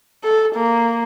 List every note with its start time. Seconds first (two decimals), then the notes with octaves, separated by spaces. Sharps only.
0.24 A4
0.56 A#3